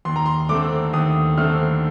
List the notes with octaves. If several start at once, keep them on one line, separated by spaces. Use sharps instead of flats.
D#2 C6
A#5
C6
D3 A3 C4 D6
D#2 D#6
D3 A3 C4 F6